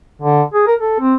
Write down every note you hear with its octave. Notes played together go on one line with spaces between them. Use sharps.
D3
G#4
A#4
A4
C4